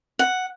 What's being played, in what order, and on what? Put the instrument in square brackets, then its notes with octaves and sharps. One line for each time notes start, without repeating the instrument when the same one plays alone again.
[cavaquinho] F#5